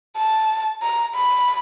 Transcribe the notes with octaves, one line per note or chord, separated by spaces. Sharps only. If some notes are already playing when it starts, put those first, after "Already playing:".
A5
A#5
B5